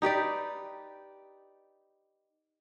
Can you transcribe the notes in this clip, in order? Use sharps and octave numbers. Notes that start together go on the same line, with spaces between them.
D#4 G4 B4 D5